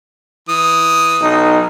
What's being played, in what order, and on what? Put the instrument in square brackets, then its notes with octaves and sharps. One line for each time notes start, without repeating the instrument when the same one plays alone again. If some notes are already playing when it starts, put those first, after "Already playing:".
[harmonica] E3 D#6
[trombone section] B1 D#4